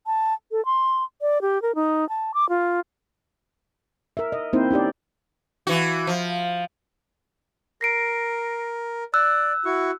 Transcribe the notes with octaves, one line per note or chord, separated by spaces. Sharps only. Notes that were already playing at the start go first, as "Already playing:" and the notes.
A5
A4
C6
D5
G4
A#4
D#4
A5
D6
F4
A#4 E5
D#5
A#3 C4 D#4 E4 C5
C#4 D#4 G4 D5
E3 F#4
F3
A#4 A#6 C7 D7
D5 E6 F#6
E4 F#4 C#6